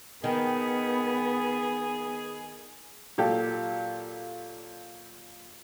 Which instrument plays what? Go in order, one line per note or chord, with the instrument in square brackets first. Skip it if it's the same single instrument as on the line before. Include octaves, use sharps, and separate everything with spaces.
[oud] D#3 [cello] B3 [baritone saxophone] G#4
[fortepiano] A#2 F#3 G4 A4